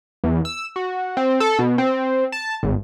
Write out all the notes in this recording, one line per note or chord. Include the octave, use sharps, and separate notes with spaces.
E2
E6
F#4
C4
A4
B2
C4
A5
G#1